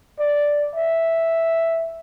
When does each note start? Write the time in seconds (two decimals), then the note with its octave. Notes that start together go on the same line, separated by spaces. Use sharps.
0.19 D5
0.75 E5